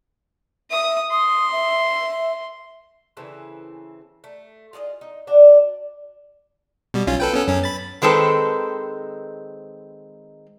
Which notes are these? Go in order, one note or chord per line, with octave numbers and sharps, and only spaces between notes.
E5 D#6
C6 D#6
E5
C#3 E3 C4 A4
A3
F4 G#4 D5 D#5
D#4
D4 F#4 D5
B2 G3
B1 C#4 F4
A4 B4 G5
B3 C#4 A4
F#2 C#4
B5 A6
D#3 G#3 C4 A4 B4